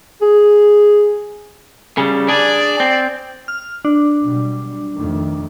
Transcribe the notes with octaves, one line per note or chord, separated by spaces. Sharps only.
G#4
C#3 G3
D4 G#4 D5
C4
F6
D4
B2 F#3 G3
F2 D#3 A3